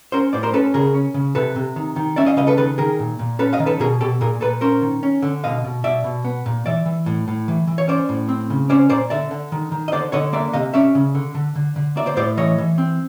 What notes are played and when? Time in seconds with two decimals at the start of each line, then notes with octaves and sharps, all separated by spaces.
0.12 C#4 A#4 C5
0.33 A2 C5 D5
0.43 A#4 C5
0.53 C#4 A4 B4
0.74 C#3 G#4 A#4
0.94 C#4
1.14 C#3
1.35 C3 A4 B4
1.56 C3
1.76 D#3
1.96 D#3
2.16 C#4 D5 E5
2.26 D#5 F5
2.37 C#3 D#5 F5
2.47 A4 B4
2.57 D#3 A4 B4
2.78 D#3 G#4 A#4
2.99 A#2
3.19 A#2
3.39 C#4 A4 B4
3.53 D#5 F5
3.60 D#3
3.66 A4 B4
3.80 B2 G#4 A#4
4.01 B2 G4 A4
4.21 A#2 G#4 A#4
4.41 A#2 A4 B4
4.61 C#4 A#4 C5
4.82 D#3
5.03 C#4
5.22 D3
5.44 B2 D#5 F5
5.64 B2
5.84 B2 D5 E5
6.04 B2
6.25 B3
6.46 A#2
6.66 E3 D5 E5
6.86 E3
7.06 A2
7.28 A2
7.48 E3
7.67 E3
7.78 C#5
7.88 C#4 C5 D5
8.09 A2
8.29 C4
8.50 C#3
8.70 C#4 C5 D5
8.90 A#2 C5 D5
9.10 D3 D5 E5
9.31 D3
9.52 D#3
9.72 D#3
9.88 D#5
9.92 D3 C5 D5
10.12 D3 C#5 D#5
10.33 A#3 D5 E5
10.53 C3 D#5 F5
10.74 C#4 D5 E5
10.95 C#3
11.15 D3
11.35 D3
11.56 D3
11.76 D3
11.96 A#3 D5 E5
12.06 C5 D5
12.16 A2 C5 D5
12.37 E3 C#5 D#5
12.58 E3
12.78 C4